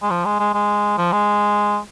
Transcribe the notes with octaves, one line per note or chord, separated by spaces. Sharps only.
G#3
F3
G#3
G#3
G#3
F3
G#3